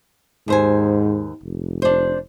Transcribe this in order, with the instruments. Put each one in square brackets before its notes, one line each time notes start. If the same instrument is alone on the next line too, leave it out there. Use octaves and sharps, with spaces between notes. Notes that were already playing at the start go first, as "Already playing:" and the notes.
[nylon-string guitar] D#2 C5 G#5 [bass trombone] G#2
[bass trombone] F1
[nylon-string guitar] D4 C5